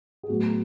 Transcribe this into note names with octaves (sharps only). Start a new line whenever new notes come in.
G#4
A2 F#3 B3 F#4